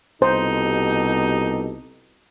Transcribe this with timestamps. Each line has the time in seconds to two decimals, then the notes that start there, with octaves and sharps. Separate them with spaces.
0.22 C2 B2 D#4 G4 A4 C5